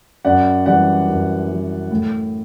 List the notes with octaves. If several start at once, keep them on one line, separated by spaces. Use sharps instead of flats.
F#2 D5 F#5
E3 G3 D5 F#5
F#2
E3 G3
A2